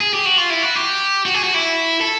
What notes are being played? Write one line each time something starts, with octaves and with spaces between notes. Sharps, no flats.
G#4
G4
F#4
F4
E4
F#4
G4
F#4
G#4
F#4
E4
A4